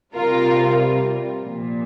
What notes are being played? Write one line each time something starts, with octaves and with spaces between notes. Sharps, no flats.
C3 G3 F4 A#4
A#2 F3